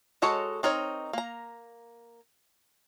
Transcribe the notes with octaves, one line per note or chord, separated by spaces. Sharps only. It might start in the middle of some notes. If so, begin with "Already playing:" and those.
G#3 F#4 A4 C#5 D#5
C4 D#4 A#4 C#5
A#3 A#5